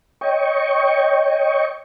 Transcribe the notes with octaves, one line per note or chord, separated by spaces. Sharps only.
C#5 D#5 G5 C#6